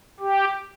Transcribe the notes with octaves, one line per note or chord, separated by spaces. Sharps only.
G4